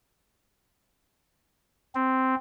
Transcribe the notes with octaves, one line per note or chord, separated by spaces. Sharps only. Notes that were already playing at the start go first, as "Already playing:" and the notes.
C4